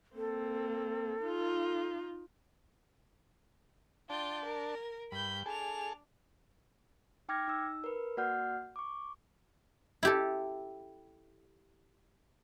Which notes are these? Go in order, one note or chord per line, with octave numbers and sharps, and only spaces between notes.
A#3 C4 A4
D#4 F4
D4 F4 G5 A5
A#4
G2 B5 G6
D4 G#4 A4 F7
D#4 G5 D6 F6 G#6 A#6
D#4 E6
A#4 B4
A#3 F#4 D5 F#5 F6 G6
C#6 D6
E4 G4 A4